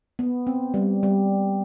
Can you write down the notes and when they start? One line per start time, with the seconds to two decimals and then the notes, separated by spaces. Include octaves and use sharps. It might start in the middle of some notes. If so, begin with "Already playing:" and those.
0.19 B3
0.47 C4
0.74 G3
1.03 G3